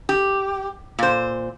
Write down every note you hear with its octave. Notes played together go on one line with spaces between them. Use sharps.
G4
A#2 C5